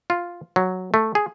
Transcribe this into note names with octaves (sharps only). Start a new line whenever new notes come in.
F4
F#3
A3
G#4